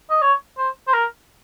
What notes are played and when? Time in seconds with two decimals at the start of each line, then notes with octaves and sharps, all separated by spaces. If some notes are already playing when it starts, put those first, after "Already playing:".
0.10 D#5
0.22 C#5
0.58 C5
0.88 C5
0.93 A#4